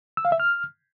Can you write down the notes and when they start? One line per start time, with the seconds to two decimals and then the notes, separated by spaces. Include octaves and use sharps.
0.17 E6
0.25 F5
0.32 E5
0.40 F6